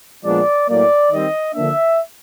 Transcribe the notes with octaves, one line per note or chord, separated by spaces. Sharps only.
A#2 F3 G#3 B3 D4 D5
A2 F#3 A#3 D5
D#3 G3 C4 D#5
D3 F3 A#3 D4 E5